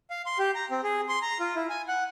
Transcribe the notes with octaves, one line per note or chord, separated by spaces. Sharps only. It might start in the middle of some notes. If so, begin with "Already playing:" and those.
F5
C6
G4
A#5
C4
G#4
C6
A#5
F4
E4
G#5
F#5